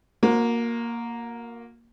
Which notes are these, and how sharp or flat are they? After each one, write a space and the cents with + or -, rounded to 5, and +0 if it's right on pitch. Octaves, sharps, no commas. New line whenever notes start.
A#3 +0 F#4 -40